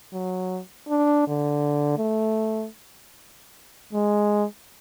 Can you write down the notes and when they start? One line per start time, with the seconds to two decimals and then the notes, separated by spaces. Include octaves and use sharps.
0.13 F#3
0.89 D4
1.27 D3
1.98 A3
3.93 G#3